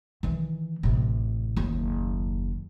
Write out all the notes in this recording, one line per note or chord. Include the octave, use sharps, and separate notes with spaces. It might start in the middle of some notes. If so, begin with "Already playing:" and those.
D#3 E3
A1 C3
F#1 D#2